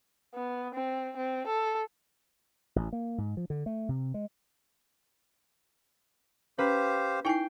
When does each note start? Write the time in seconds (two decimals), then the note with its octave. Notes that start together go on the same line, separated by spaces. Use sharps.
0.34 B3
0.74 C4
1.17 C4
1.47 A4
2.76 A1
2.93 A#3
3.18 G#2
3.37 F3
3.50 D3
3.66 A3
3.89 C3
4.14 G#3
6.59 C#4 G4 B4 C5 F5
7.25 D#4 E4 G5 G#5 C7